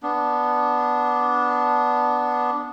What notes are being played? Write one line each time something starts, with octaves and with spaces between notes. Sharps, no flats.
B3 D4